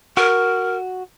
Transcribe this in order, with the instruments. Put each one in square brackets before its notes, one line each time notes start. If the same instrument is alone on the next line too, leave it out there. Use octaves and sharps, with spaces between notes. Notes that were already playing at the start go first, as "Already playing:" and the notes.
[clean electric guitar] F#4 [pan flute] A#4